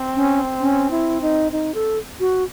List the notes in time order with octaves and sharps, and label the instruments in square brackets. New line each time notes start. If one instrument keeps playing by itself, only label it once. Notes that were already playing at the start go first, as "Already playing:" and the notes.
Already playing: [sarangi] C4
[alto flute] C#4
C#4
E4
D#4
D#4
A4
F#4